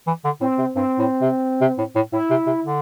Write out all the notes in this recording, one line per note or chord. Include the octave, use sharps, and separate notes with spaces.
E3
D3
A2 C4
C3
G2 C4
A2
C3
C3
A2
A2
A2 E4
C3
C3
D3